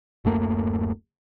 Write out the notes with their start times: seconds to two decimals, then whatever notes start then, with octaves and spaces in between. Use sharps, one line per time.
0.25 D1 F#2 A3 A#3